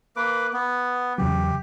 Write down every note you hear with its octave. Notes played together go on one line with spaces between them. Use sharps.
A#3 B4 D6
B3
E2 C#3 F#3 G4